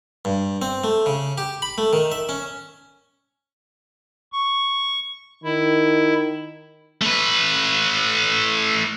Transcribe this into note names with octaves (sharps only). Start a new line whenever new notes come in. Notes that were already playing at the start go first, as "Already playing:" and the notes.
G2
C4
A3
C#3
G4
B5
A3
D#3
E5
C#4
C#6
D#3 E4
A3 B4